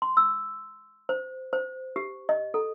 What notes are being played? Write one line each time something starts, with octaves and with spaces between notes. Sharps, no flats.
C6
E6
C5
C5
G4
D#5
A4